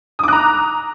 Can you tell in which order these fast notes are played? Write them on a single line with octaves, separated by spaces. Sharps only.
D#6 D6 F#6 A#5